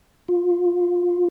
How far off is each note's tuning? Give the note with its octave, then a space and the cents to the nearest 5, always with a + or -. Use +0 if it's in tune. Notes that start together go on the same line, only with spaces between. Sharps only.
F4 +15